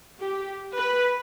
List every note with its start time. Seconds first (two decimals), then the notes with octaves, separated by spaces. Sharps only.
0.19 G4
0.76 B4